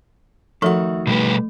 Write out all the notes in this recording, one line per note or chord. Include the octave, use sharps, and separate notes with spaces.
D#3 F3 A3 F#4 A4 E5
B2 G3 A3 B4